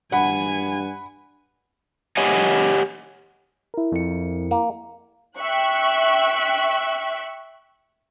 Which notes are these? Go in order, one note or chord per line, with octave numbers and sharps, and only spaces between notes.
G2 F#5 G#5 B5
G4 C#5 D#5 F#5 G#5
E4 A#4
F2 C#7
A#3
E5 G5 C#6 F#6